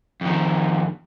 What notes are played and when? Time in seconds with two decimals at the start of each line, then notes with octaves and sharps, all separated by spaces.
0.21 F2 D#3